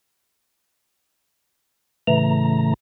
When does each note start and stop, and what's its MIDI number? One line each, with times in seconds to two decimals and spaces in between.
2.07 2.74 45
2.07 2.74 49
2.07 2.74 52
2.07 2.74 57
2.07 2.74 82